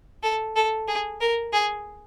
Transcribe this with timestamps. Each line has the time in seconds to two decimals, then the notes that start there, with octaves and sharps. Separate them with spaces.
0.23 A4
0.56 A4
0.87 G#4
1.20 A#4
1.53 G#4